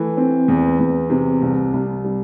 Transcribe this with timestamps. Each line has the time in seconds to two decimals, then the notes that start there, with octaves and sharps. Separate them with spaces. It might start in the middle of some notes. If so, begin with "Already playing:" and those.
Already playing: E3 A3
0.17 C4
0.48 E2
0.79 E2
1.10 C3
1.42 C2
1.73 C2
2.04 G3